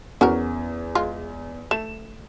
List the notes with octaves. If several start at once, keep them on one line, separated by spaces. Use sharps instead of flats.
E2 C#4 F#4 A#4
G#3 F4
A3 E7